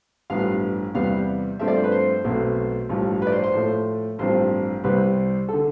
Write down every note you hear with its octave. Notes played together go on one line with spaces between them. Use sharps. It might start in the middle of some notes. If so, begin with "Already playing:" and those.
A1 G2 F3 B3 F5
E2 C3 G3 B3 F5
G2 F3 A3 C4 E5
D5
C5
B4
C5
B1 B2 A3 C4
A1 G2 F3
B4
D5
C5
C5
A2 F3 A3
A1 G2 F3 C4 C5
C2 C3 G3 C4 B4
A4
D3